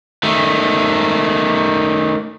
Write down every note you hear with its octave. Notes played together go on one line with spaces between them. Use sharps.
D#3 A3